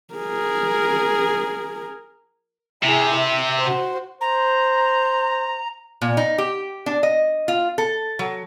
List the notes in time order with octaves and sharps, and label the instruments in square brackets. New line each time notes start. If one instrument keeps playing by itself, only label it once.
[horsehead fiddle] G#4 A#4
[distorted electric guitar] C3 [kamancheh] E4 G#4
[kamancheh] E5
F#4 C5
[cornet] C5 [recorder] A#5
[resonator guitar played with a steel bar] A#2
D#4
G4
D4
D#5
F4
A4
F#3